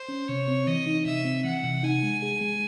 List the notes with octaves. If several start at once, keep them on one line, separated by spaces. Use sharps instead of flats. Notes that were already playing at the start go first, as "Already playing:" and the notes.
Already playing: C5
C#4
C3 C#5
C4
E3 D#5
D#4
C3 E5
C4
E3 F#5
C3
D#4 G#5
G#3
G#4
G#3